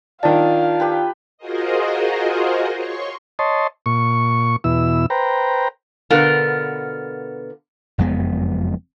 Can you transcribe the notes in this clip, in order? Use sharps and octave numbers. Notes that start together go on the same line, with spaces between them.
D#3 D4 F4 F5 A5
G4 B4 G5
F4 F#4 G#4 A#4 C5 D#5
C#5 C6 C#6
C#5 D#5 A5 C6
A#2 C#6
E2 B2 E4 E6
B4 C5 G5 A#5
B2 D3 B3 F4 A#4
F#1 F2 G#3 B3